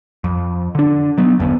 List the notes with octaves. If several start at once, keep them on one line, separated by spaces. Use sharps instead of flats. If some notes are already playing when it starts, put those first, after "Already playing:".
F2
D3 D4
F#3 B3
F#1 E2 D3 B3